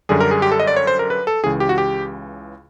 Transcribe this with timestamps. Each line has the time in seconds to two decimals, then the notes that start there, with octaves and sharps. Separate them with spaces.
0.09 F#2 D3 G3 G#4
0.20 A#4
0.31 G#4
0.42 G4
0.52 A4
0.60 D#5
0.67 D5
0.76 C#5
0.87 C5
0.99 A#4
1.10 B4
1.27 A4
1.44 C#2 C#3 E3 G#4
1.60 G4
1.69 F#4
1.78 G4